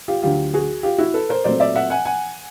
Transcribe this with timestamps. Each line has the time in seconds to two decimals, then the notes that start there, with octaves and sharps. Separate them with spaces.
0.08 F4 G4
0.22 D2 D3 F#3 F4 G4
0.54 F#4 G#4
0.83 F4 G4
0.98 E4 F#4
1.14 A4 B4
1.29 A#4 C5
1.44 A#2 F#3 A3 C4 C5 D5
1.60 D5 E5
1.75 E5 F#5
1.90 F#5 G#5
2.05 F#5 G#5